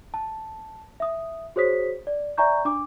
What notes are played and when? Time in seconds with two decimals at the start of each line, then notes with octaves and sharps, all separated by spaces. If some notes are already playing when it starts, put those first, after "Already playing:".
0.14 A5
1.00 E5 D#6
1.56 F#4 G#4 C5 C#5 D#6 B6
2.07 D5
2.37 D5 E5 G#5 A#5 C#6 G6
2.65 D4 D6